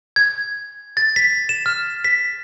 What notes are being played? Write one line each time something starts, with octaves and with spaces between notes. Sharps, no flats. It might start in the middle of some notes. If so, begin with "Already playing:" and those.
G#6
A6
B6
E7
F6
B6